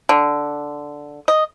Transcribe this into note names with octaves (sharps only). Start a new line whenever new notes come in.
D3
D#5